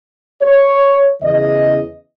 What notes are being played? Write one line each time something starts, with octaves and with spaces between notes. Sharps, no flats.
C#5
E2 C#3 E3 D#5